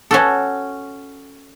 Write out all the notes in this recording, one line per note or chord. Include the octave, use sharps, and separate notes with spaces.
C#4 F#4 A4